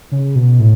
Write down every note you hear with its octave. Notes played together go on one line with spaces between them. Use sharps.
C#3
B2
A2